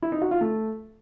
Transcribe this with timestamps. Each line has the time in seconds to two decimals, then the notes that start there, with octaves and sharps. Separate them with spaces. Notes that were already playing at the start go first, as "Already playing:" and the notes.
0.02 E4
0.12 D#4
0.22 F#4
0.31 F4
0.41 A3